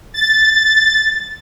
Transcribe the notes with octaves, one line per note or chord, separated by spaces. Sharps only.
A6